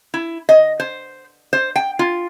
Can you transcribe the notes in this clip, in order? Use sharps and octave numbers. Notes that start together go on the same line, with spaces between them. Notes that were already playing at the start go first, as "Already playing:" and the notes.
E4
D#5
C5
C5
G5
F4